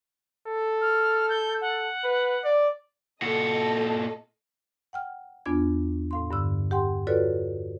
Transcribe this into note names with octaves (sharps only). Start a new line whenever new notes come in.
A4
F6
G6
F#5
B4
D5
A#2 F#4 A4 D#5
F#5 G5 F6
E2 B3 D4 F4 G#6
A2 F5 C6
G2 D3 E6
G4 F#5 G5 C6
F4 F#4 A4 B4 C#5 D5